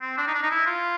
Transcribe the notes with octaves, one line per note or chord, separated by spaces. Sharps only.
C4
D4
D#4
D4
D#4
E4
F4